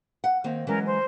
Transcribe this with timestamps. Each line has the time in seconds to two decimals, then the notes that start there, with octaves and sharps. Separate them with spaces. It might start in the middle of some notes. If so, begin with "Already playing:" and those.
0.24 F#5
0.44 D#3 A#3 C4
0.67 E3 F#3 G#3 C#4 A#4
0.87 C5